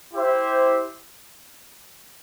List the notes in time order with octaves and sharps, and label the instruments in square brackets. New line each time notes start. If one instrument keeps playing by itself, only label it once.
[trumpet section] E4 G4 C5 E5